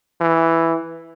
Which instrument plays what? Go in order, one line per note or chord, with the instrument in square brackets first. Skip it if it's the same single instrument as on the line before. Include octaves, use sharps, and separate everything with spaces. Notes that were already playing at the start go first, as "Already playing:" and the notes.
[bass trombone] E3